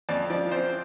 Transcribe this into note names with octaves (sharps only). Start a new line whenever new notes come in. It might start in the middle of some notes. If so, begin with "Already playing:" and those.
F2 D5
F3 D5
C4 C5